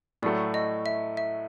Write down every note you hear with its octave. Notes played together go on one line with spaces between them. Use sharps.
A2 F#3 A3 D5
D#5
E5
E5